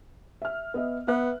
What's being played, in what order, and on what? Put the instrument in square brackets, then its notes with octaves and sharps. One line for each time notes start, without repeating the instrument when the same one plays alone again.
[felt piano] E5 F6
B3 D#5 E5
[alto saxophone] B3 [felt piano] B4 E5 F#6